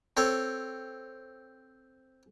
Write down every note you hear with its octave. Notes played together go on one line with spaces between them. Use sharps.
C4 A4 C#5